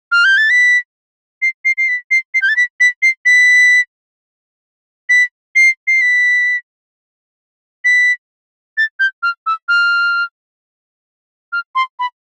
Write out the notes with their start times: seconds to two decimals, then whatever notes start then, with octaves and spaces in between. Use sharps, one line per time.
0.12 F6
0.25 G6
0.37 A6
0.50 B6
1.42 C7
1.65 C7
1.78 C7
1.88 B6
2.11 C7
2.34 C7
2.42 G6
2.49 A6
2.57 B6
2.80 B6
3.02 C7
3.26 B6
5.09 B6
5.56 C7
5.87 C7
6.01 B6
7.85 B6
8.77 A6
9.00 G6
9.23 F6
9.46 E6
9.68 F6
11.53 F6
11.75 C6
11.99 B5